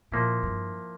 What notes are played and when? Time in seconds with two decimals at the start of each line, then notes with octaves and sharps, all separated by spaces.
0.11 A#2 F3 A#3 E4
0.43 G2